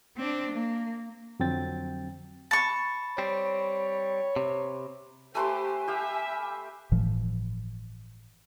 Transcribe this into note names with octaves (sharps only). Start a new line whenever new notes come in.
C4 D4
A#3
F2 D3 F#3 C4 G5 A6
A5 B5 C#6
G3 C4 C#5
C3
A3 G4 B4 C5 G#5 C6
G4 E5 F5 G5
G1 A2 E3 F3